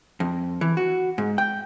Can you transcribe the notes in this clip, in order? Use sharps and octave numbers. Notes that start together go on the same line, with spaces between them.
F2
E3
F#4
G#2
G5